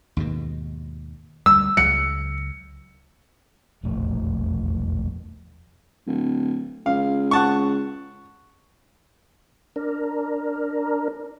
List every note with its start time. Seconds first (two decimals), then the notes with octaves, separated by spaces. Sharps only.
0.17 D#2 G#2 B2
1.46 D2 G3 E6
1.77 C#2 C#3 F#3 C#7
3.83 E1 A#1 F2 A3
6.07 D1
6.86 C#2 F5
7.31 F#5 A5 C#6
9.76 D4 A#4